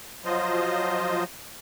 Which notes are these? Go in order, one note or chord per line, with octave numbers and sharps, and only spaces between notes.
F3 F#3 F4 C5 D#5